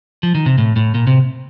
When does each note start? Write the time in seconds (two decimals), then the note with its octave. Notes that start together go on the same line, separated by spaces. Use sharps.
0.23 F3
0.35 D#3
0.46 C3
0.58 A2
0.76 A2
0.95 A#2
1.07 C3